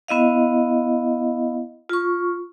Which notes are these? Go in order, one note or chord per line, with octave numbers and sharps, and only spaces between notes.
B3 E4 D#5 F5
F4 C#6